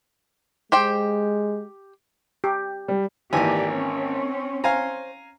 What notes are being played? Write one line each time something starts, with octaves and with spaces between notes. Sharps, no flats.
G#3 G4 C5 G5
G4
G3
G#1 E3 A#3 G4 D5 G#5
C4 C#4 C#5
C5 F5 G#5 A#5